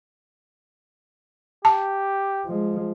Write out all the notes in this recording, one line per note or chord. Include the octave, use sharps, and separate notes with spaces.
G4 A5
F3 G#3